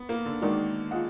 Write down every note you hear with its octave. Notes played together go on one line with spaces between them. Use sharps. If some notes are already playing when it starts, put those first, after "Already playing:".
Already playing: B3
A#3
D3
D#3 G#3 D#4 F#4 A#4 D5
F4 G#4 D#5 F#5